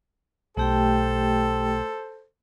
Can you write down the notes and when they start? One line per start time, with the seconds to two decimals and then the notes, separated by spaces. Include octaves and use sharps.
0.57 B1 A3 G4 A4 C5 G5